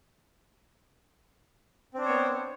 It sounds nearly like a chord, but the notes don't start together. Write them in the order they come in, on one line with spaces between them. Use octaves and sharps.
C4 D4 C5 C#5 B3